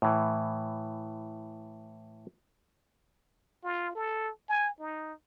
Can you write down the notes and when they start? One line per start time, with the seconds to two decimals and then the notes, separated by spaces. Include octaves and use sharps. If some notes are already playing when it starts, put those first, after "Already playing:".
0.02 A2 E3
3.64 F4
3.95 A4
4.49 G#5
4.80 D#4